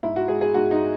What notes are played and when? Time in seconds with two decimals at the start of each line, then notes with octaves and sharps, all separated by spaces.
0.03 G#2 E4
0.16 F#4
0.28 G#3 G#4
0.41 G#4
0.54 G#2 F#4
0.71 D#4